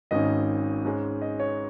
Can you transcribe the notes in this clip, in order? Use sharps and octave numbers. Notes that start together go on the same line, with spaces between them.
G#1 G#2 D#3 C#4 D#5
G#2 G#3 C#4
D#5
C#5